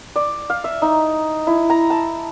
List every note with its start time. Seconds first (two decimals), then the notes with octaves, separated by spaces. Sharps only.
0.16 D5
0.50 F5
0.64 E5
0.82 D#4
1.47 E4
1.70 A#5
1.90 A5